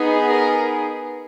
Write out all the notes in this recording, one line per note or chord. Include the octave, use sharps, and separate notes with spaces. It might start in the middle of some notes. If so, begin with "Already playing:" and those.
Already playing: B3 D#4 G#4
A#4